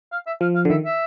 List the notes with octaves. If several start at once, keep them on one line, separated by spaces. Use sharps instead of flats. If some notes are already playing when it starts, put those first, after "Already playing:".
F5
E5
F3 F5
F5
D3
D#3 E5
E5